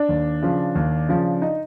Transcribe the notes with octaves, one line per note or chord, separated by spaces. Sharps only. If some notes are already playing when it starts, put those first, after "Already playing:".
Already playing: D4
D#2
C#3 F3
D#2
C#3 F3
D#4